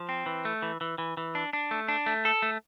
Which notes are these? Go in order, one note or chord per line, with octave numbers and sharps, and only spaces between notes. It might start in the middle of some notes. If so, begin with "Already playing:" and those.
Already playing: F3
C4
E3
A3
E3
E3
E3
E3
D4
D4
A3
D4
A3
A4
A3